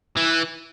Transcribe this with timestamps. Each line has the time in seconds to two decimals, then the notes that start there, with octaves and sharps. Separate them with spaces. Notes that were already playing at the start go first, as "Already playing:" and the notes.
0.17 E3